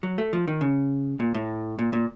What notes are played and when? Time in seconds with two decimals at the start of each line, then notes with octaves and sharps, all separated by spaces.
0.03 F#3
0.18 A3
0.33 F3
0.48 D#3
0.61 C#3
1.20 A#2
1.34 A2
1.79 A#2
1.93 A#2